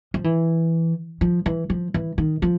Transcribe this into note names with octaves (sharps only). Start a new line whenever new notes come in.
F3
E3
F3
E3
F3
E3
D#3
F3